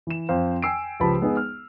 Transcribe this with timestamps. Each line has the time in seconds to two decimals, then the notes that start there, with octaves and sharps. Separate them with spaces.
0.07 E3 E7
0.29 F2 C5 F5
0.62 G5 G#5 E6 C7 D7
1.00 C#2 F3 G4 B4 A5 B5
1.21 G#3 B3 D#4 G#4
1.37 F6